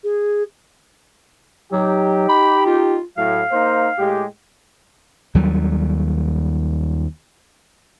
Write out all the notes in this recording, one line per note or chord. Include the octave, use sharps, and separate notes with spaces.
G#4
F#3 D#4 G4
B5
F4
A2 F#3 F5
A#3 D#4 C5
A2 G#3 G4
D#2 F#3 G3